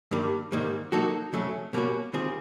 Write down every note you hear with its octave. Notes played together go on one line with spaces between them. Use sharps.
G2 D#3 G3 A#3
G#2 D#3 G3 A#3
F#3 A#3 D#4 F#4 A4
F2 C#3 F#3 A3 C#4
B2 G3 A#3 C#4 F#4
D#3 G3 C4 F4 G#4